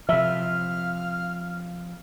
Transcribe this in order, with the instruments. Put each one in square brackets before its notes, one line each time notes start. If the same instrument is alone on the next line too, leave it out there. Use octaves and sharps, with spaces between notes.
[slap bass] C3 F3 [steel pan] E5 [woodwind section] F5 F6